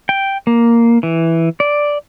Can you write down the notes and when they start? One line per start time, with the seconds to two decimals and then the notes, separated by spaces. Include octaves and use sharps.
0.09 G5
0.47 A#3
1.03 E3
1.60 D5